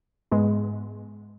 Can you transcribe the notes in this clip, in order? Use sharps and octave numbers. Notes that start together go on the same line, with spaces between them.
G#2 G#3 B3